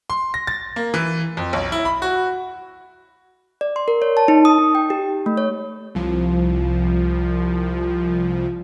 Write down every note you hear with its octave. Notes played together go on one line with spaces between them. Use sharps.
C6
A#6
A6
A#3
E3
F2
B1
E4
B5
F#4
D5
C6
A#4
C#5
A5
D#4
D#6
D#4
G5
G4
A3
C#5
C2 F3